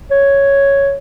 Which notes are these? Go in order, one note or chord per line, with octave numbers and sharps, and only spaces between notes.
C#5